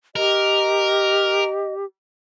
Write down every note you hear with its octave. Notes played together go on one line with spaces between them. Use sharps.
G4 A#4 D#5